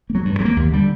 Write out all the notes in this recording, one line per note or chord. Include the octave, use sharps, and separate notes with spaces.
A#3
F#3
G2
F#3
A#3
D#2
D3 G3